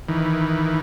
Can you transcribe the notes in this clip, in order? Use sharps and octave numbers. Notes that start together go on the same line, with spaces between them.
D#3 E3